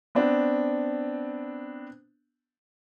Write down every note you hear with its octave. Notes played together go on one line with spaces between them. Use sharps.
B3 C4 D4